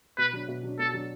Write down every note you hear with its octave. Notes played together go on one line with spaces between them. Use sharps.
B2 B4
F#3 D4
B2
F#3 D4
B2 A4
F#3 D4